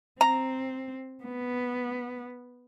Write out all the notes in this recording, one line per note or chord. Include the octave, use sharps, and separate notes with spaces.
C4 A#5
B3